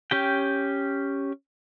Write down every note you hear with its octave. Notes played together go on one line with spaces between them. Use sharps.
C#4 G4 G5